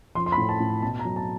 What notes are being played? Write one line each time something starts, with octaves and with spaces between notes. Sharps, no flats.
F3 C6
C6
B5
A2
A5
A2
B2 A5
A#5
F#3
A5